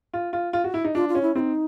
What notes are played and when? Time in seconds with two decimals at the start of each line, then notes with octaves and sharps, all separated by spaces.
0.14 F4
0.33 F4
0.53 F4
0.64 F#4
0.74 E4
0.85 D#4
0.95 D4 F4
1.09 F4
1.15 C#4
1.22 E4
1.35 C4 D#4 E4